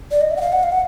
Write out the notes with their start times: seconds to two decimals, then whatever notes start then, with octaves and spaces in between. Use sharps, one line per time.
0.11 D5
0.21 D#5
0.31 E5
0.37 F#5
0.41 F5
0.52 F#5
0.63 F5
0.72 F#5